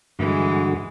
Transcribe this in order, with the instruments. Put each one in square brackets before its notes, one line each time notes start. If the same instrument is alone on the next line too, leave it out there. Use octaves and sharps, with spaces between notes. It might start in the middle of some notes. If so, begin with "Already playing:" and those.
[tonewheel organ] G2 D3 F#4 [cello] E3 G#3